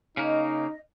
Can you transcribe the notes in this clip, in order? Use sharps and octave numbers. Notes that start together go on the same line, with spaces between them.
C#3 A#3 D#4 D#5